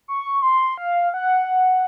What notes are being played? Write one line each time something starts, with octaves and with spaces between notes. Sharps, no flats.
C#6
C6
F5
F#5